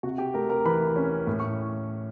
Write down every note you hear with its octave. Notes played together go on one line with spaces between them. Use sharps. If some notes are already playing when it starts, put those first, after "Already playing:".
C3 F#4 F#5
G4 G5
A3 A#4 A#5
A#4 A#5
E3 B4 B5
C#4
A2
C#6